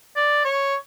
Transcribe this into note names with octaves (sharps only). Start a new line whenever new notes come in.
D5
C#5